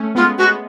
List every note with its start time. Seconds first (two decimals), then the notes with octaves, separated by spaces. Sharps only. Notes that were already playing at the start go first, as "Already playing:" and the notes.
Already playing: A3 C#4
0.15 G#3 B3 F4
0.38 G#3 B3 F#4